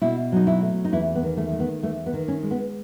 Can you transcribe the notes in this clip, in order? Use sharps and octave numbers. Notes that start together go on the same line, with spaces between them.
B2 E4
F#3 D#4
E4
A3
D#4
E2 E4
B3
D#3
A3
A3
B3
E2 A3
B3
D#3
C#4
G#3
B3